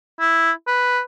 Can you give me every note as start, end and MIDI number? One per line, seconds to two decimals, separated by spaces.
0.20 0.51 64
0.67 1.01 71